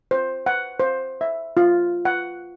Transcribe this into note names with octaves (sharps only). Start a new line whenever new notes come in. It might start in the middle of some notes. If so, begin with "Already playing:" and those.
C5
F#5
C5
E5
F4
F#5